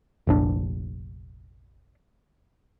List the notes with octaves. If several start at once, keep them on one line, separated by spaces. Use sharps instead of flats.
F1 A#1 D4